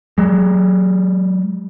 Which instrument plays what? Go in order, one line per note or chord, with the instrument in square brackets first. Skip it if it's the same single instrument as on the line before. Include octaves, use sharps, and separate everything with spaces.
[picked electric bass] F#3 G#3